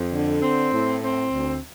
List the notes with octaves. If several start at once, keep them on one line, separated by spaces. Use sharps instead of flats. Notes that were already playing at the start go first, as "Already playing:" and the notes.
Already playing: F2
D3
C4
A2
C4
D2